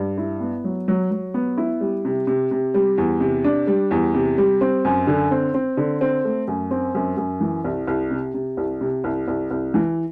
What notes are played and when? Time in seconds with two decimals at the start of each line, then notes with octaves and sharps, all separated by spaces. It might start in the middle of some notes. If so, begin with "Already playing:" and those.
Already playing: G2
0.18 E4
0.40 B3
0.64 F#3
0.88 F#3
1.11 F#3
1.34 B3
1.58 E4
1.81 G3
2.05 C3
2.27 C3
2.51 C3
2.74 G3
2.98 E2
3.20 C3
3.44 D4
3.67 G3
3.91 E2
4.14 C3
4.38 G3
4.61 C4
4.85 F#2
5.07 D3
5.31 C4
5.54 C4
5.77 D3
6.01 C4
6.24 A3
6.48 F#2
6.71 C4
6.95 F#2
7.17 F#2
7.41 E3
7.64 C2
7.87 C2
8.11 C3
8.34 C3
8.57 C2
8.81 C3
9.04 C2
9.28 C2
9.51 C2
9.74 E3